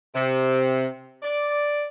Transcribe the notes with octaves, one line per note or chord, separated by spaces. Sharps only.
C3
D5